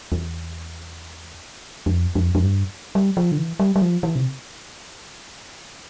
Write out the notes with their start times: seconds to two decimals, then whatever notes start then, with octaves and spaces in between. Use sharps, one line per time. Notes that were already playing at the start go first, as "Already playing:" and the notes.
0.12 E2
1.86 F2
2.15 F2
2.35 F2
2.43 G2
2.95 G3
3.17 F3
3.32 D3
3.38 E3
3.60 G3
3.76 G3
3.82 F3
4.03 E3
4.16 C3